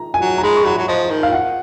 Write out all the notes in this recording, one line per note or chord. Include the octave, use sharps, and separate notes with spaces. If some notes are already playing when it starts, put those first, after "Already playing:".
Already playing: A#5
G#5
F#3
A#5
G#3 B5
C#6
F#3 B5
F#3
F3 D#5
D#3
F5
F#5